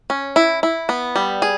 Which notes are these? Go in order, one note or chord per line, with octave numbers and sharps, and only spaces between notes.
C#4
E4
E4
B3
G3
G#4